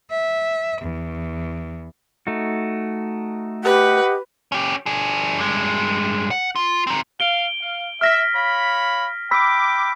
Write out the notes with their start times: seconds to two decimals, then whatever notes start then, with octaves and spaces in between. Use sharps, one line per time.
0.10 E5
0.81 E2
2.27 A3 D#4 F#4
3.64 G4 B4 D#5 F#5
4.52 C#4 G4
4.86 D4 G#4
5.39 G2 G#3
6.31 F#5
6.56 F4
6.87 C4 D#4
7.20 F5 D7 G7
7.61 F5
8.01 E5 F6 A#6 B6
8.35 C#5 F5 B5
9.31 G5 B5 D6 E6 B6